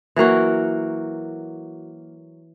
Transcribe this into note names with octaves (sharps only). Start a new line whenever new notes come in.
E3 F#3 A#3 F#4